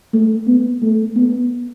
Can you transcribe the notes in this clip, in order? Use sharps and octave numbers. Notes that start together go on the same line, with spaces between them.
A3
B3
A3
B3